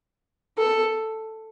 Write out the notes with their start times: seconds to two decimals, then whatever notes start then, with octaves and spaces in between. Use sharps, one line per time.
0.58 A4